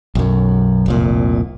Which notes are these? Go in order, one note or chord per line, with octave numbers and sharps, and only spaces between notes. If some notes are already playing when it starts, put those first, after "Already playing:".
B1 F#2
F1 C2 A#2